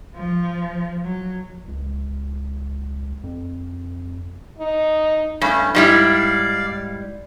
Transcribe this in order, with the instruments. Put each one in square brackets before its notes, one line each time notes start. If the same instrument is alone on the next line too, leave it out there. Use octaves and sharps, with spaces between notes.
[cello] F3
F#3
[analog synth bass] C#2
F2
[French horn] D#4
[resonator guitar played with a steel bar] G2 [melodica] A3 C#4 E4
[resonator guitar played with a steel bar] G#2 G3 E4 [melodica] D5 F5